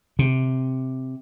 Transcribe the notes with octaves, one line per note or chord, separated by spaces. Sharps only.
C3